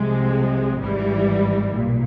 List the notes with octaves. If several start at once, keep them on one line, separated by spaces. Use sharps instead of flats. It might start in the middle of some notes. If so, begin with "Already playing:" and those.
Already playing: C2 C3 F3 G#3
G#1 G#2 E3 G3
B1 A#2